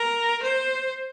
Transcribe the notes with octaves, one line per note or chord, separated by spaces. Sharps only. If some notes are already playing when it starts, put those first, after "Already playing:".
Already playing: A#4
C5